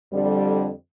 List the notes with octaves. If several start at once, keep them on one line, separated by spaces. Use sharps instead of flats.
F2 D3 G3